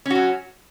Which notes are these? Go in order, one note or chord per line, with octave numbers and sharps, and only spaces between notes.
F#3 C#4 F#4